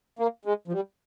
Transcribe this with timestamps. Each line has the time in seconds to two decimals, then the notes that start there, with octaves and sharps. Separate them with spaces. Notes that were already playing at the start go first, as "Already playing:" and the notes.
0.19 A#3
0.45 G#3
0.68 F3
0.72 G3